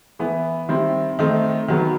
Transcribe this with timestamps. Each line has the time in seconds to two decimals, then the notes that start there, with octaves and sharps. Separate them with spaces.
0.19 E3 B3 E4
0.69 D#3 G3 C4 E4
1.19 D#3 A3 C4 D#4
1.68 D#3 F#3 B3